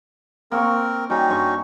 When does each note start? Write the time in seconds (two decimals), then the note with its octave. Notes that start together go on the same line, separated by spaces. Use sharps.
0.52 A#3 C4 A#4 C#6
1.10 G3 C#4 D#4 F#4
1.29 G2 C#6